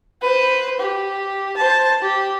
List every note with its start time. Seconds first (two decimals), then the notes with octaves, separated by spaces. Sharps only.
0.22 B4 C5
0.80 G4
1.57 C5 A5
2.02 G4